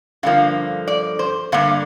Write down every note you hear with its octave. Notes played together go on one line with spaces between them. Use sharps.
G2 D3 F3 A#3 F5
D5
C5
G2 D3 A#3 F5